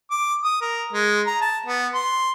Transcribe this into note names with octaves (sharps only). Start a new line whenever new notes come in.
D6
D#6
A#4
G#3
A#5
A5
B3
C6